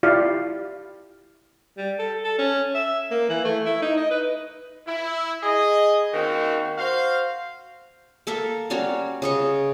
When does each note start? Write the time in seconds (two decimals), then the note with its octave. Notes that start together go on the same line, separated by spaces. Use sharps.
0.03 E4 F4 G4 D5 F5
1.77 G3
1.99 A4
2.24 A4
2.38 C#4
2.74 E5
3.11 A#3
3.29 E3
3.44 A3
3.66 E4
3.82 D#4
3.97 D#5
4.11 B4
4.88 E4
5.43 G#4 D#5
6.13 D#3 A#3 C4 C#4 F#4
6.78 F#4 C5 F5
8.27 A#3 A4 E5 A#5
8.70 G3 C#4 F#4 A#5
9.22 C#3 D#5 C#6